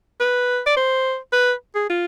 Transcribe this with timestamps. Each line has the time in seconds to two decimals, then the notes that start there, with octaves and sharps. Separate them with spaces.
0.21 B4
0.67 D5
0.77 C5
1.33 B4
1.75 G#4
1.89 F4